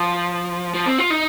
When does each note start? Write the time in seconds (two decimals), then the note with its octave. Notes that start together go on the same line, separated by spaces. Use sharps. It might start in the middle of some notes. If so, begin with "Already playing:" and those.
Already playing: F3
0.74 F3
0.86 C4
0.98 F4
1.10 D#4